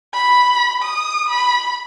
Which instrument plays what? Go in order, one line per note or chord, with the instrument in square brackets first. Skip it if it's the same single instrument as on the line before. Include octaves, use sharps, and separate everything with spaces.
[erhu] B5
D#6
B5